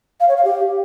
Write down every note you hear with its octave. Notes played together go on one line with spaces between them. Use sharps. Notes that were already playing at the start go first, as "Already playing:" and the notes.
F5
C#5
F5
G4